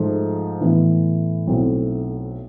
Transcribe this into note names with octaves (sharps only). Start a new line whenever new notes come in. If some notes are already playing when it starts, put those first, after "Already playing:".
Already playing: G#2 F3 A3
A2 E3 B3
B1 B2 A3 C4 E4